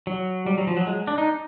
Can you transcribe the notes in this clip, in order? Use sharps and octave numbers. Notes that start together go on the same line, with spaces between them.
F#3
G3
F#3
F3
F#3
G#3
D4
D#4